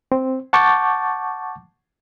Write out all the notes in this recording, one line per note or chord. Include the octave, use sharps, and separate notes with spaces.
C4
F#5 A5 C#6 D6 G6 A6